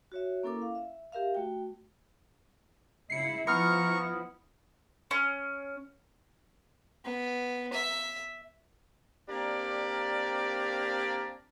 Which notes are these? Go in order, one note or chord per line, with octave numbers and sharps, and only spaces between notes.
F#4 C#5 E5
A#3 C#4 E4 A4 A#4 D6
F5
E5
G4 A#4 E5 F5
A3 F#4 G5
C#3 E4 C7 C#7
F3 B3 E4 A#5 C#6 F6 C#7
C#4
B3
E5
A#3 C4 D4 G4 A#4 D5